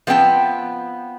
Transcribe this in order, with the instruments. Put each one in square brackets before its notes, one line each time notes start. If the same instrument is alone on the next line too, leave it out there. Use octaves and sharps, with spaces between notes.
[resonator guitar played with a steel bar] F3 B3 C4 G5 A5